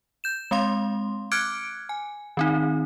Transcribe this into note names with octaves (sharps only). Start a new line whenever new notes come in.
G6 E7
G#3 C4 F5 C6
D6 F6 F#6 G#6 C#7 D7
G#5
D#3 C4 D#4